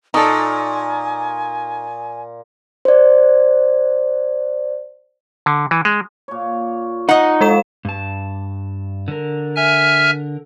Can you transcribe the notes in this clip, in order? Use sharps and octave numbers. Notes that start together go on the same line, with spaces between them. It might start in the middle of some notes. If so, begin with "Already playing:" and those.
A#2 D#4 A4 G#5 A#5 C#6 D#6
C5 D5
D3
E3
G#3
A#2 C#5
D#4 D#5 F#5
F3 G#3 A4 C6 E7
G2 A5
D3 A#4
E5 G#5 F6